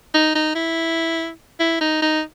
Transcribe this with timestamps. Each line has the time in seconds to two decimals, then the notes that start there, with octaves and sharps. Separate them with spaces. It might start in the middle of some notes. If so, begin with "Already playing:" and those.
0.14 D#4
0.35 D#4
0.55 E4
1.60 E4
1.81 D#4
2.02 D#4